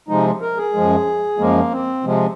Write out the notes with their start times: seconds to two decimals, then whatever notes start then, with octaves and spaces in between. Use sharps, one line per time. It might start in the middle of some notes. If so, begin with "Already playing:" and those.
0.08 C3 F3 G#3 D#4
0.41 A#4
0.57 G#4
0.73 F#2 F3 G#3
1.38 F#2 F3 G#3 A#3
1.71 C4
2.04 C3 F3 G#3